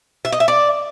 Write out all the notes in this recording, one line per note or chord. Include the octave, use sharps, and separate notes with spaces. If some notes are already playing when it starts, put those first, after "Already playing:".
E5
D#5
E5
D5